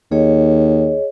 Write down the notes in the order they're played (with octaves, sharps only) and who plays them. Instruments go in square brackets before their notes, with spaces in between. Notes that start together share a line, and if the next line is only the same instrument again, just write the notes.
[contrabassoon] D#2 [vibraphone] G#4 C#5 D#5